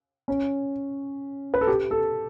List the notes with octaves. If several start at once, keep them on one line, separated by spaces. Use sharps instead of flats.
C#4
B4
A4
G4
A4